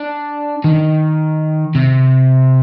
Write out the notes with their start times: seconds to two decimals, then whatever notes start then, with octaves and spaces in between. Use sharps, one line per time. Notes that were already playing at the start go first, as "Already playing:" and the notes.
Already playing: D4
0.64 D#3
1.75 C3